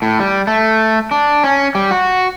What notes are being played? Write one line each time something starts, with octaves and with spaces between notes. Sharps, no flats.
A2
G3
A3
D4
C#4
G3
F#4